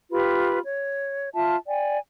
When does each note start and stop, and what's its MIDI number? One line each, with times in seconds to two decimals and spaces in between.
0.12 0.58 65
0.12 0.58 67
0.12 0.58 71
0.12 0.58 83
0.64 1.30 73
1.34 1.55 65
1.34 1.55 76
1.34 1.55 81
1.66 1.98 74
1.66 1.98 79
1.66 1.98 80